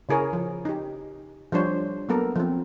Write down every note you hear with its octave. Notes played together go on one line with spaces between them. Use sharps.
C#3 E4 G#4 A#4 C#5
F3
D#4 G4
F3 G3 D4 C5 C#5
F#3 A#3 B3 A4 A#4
F3 C4